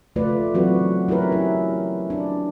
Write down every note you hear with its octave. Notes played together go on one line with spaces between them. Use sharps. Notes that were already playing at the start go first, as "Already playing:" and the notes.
C#3 F3 A3 F4 B4 D5
E3 F#3 C4 C#4 F#4 B4
C#4 E4 G4 A#4 B4
E4
D4